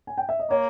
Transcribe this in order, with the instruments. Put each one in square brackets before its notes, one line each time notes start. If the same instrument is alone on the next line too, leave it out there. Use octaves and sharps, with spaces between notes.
[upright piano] G#5
G5
E5
D#5
[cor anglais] A#3 [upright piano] C#5